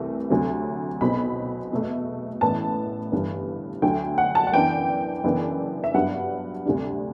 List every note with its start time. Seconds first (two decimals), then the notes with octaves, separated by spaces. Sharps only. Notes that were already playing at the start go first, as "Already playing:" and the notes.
Already playing: C2 C3 E3 A3
0.30 D2 C3 F#3
1.01 B1 B2 F#3 C4 B5
1.71 E2 B2 A3
2.41 A1 A2 E3 B3 A5
3.12 G1 G2 E3 B3
3.82 D2 D3 F#3 G5
4.18 F#5
4.35 A5
4.47 F#5
4.53 F#2 E3 B3 D4 G5
5.24 F#1 F#2 E3 B3 D4
5.84 E5
5.94 G2 F#3 B3 D4 F#5
6.65 D2 C3 G3 D4